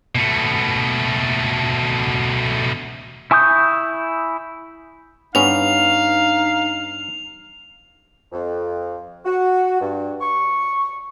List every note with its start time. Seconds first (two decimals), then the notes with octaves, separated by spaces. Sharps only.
0.15 B2 A3
3.31 E4 G#5 C#6 D#6 G6
5.35 G2 B3 C#4 D#4 F5 F7
8.32 F2
9.25 F#4
9.80 G2
10.21 C#6